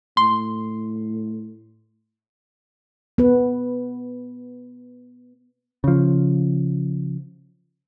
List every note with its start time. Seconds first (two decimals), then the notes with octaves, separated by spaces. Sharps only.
0.17 A2 C6
3.18 B3 B4
5.84 C#3 F3